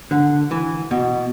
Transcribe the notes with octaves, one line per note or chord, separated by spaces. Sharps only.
D3
E3
B2